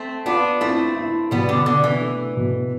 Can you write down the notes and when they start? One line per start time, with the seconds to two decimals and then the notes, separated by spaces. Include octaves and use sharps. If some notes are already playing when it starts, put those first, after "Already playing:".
Already playing: A3 C4
0.26 B3 D4 F4
0.61 A3 C4 E4
0.96 E4
1.31 B2 G3 B3
1.49 D3
1.66 D3 B3
1.84 E3
2.01 A3
2.37 B2